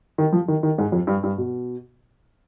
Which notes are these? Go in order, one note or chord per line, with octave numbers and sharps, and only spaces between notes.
D#3
F3
D#3
D#3
G#2
F2
G2
G2
B2